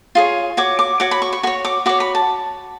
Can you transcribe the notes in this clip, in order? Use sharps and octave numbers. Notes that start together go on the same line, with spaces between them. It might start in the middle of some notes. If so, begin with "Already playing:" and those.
F4 G#4 C#5
F#4 C#5 D6
D6
F#4 C#5 D6
B5
C#6
C#6
F#4 C#5 C#6
D6
F#4 C#5 D6
B5
A5